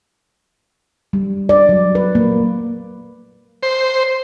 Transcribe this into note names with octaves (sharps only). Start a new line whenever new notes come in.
G3
D5
F#3
B4
A#3
C5